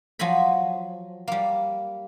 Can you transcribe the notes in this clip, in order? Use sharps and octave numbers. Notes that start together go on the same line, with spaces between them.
F3 F#3 G#5 A#5 B5
G3 A#3